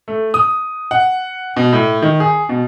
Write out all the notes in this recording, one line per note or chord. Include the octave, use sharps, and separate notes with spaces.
A3
D#6
F#5
B2
A2
D#3
G#4
B2